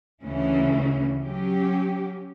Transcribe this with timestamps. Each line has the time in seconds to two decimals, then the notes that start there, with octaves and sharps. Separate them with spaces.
0.22 D2 C#3 E3 A3 C#4
1.23 F#3 C#4 G4